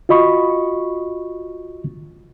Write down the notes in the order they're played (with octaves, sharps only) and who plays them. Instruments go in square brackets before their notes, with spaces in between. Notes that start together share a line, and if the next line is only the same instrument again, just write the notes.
[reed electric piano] F4 F#4 D#5 B5 C#6